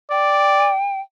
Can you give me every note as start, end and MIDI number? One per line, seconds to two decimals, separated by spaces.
0.11 0.73 74
0.11 1.01 79